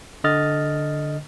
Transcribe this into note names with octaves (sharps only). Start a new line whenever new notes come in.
D3 D#5 F6 A6